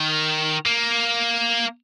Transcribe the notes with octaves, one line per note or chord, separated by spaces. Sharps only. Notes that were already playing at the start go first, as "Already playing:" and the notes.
Already playing: D#3
A#3